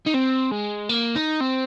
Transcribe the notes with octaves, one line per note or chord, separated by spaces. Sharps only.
D#4
C4
G#3
A#3
D#4
C4